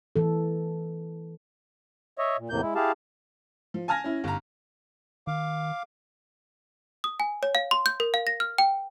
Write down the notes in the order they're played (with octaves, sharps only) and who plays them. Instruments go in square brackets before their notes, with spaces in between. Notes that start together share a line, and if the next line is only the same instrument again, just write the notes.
[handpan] E3 A4
[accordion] C#5 D#5 E5
A#2
E2 A2 C3 A#3 G6
G#3 E4
E4 G4 G#4 F5 A5
[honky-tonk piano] F3
G#5 A5 F6 G#6 A#6
C#4 E4
G1 A#5
[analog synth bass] D#3 [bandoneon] F5 D6
[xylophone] D#6
G#5
C#5
F5
C6
G6
A#4
F5
A#6
F6
G5